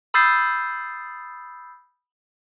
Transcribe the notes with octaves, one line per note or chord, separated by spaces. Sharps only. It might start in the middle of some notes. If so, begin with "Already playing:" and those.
B5 D#6 E6 G6 A6 C7